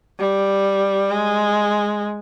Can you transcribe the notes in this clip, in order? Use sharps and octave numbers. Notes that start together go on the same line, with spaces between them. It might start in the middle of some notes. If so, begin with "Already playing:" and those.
G3
G#3